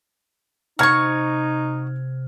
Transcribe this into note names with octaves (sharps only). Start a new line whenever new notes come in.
C3 D#4 F#4 C#6 F6 G#6